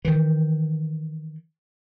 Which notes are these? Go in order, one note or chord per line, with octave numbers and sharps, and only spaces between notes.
D#3 E3